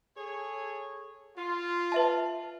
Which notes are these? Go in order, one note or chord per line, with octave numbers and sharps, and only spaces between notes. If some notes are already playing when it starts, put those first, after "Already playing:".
G#4 A4 C#5
F4
B4 E5 A5